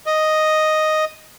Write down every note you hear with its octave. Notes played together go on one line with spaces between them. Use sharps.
D#5